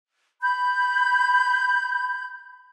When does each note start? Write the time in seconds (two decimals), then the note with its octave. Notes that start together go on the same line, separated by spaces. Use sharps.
0.42 B5 G6